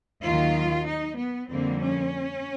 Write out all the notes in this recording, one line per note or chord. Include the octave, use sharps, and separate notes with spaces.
D#2 D#3 F#3 F4
D#4
B3
F2 D3 G3 A#3 C4
C#4